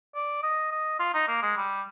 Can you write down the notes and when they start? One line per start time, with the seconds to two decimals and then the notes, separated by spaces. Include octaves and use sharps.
0.15 D5
0.43 D#5
0.71 D#5
0.99 F4
1.14 D#4
1.28 A#3
1.42 G#3
1.57 G3